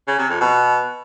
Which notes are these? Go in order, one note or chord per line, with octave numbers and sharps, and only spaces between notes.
C#3
C3
F2
B2